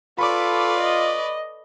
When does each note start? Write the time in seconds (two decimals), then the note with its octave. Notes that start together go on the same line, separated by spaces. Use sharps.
0.19 F4 A4 B4 D5 B5 C#6 D6
0.80 D#5